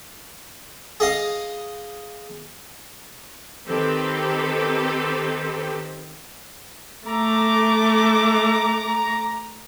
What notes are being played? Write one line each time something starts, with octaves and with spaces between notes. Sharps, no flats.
G#4 D#5 F5
D#3 C4 G4 A4 B4
A3 A#5 D6